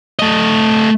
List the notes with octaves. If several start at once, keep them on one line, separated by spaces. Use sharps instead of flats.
A3 D#5